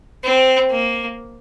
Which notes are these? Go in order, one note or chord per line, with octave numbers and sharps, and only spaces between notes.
C4
A#3